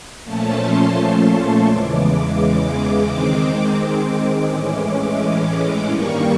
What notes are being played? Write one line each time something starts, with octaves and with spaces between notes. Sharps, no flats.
A#2 F3 A3 C#4 A5
C6
C6
C#6
E2 C#3 E3 G#3 D6
D6
D#3 G#3 C4 D6
D6
D6
A2 E3 G#3 C#4
G2 D#3 G3 A#3 C#6